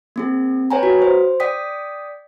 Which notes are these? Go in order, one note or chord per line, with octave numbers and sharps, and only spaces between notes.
A#3 C4 G#4
B4 C#5 G5 G#5 A#5
F#4
C5
D5 G5 D#6 B6